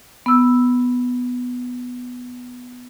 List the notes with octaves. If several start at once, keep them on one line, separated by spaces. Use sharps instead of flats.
B3 E6